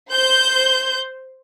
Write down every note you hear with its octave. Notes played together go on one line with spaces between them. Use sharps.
C5 G6